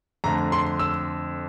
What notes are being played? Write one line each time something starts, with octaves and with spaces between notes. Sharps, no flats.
F2 D3 A3 A#5
C6
E6